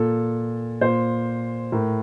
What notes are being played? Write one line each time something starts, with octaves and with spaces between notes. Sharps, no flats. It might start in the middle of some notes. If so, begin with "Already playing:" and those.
Already playing: A#2 A4
A#2 C5
A2 A#4